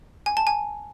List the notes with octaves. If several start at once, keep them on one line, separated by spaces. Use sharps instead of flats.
G#5
A5
G#5